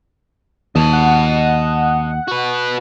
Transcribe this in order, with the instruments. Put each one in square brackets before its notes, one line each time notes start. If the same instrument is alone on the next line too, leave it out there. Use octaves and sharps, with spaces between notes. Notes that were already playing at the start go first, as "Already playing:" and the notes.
[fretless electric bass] D#2 [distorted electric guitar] D#5 A5
[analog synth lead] F#5
[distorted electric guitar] F#4 B4